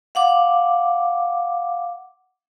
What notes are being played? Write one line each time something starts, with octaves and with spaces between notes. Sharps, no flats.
F5 F#5 D6